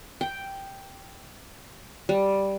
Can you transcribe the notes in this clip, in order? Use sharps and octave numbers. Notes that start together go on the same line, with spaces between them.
G5
G3